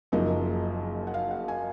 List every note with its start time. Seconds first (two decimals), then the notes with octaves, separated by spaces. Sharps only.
0.12 F#1 F#2 F3 A#3 D#4 D#5
1.07 F#5
1.14 F5
1.31 F#5
1.48 G#5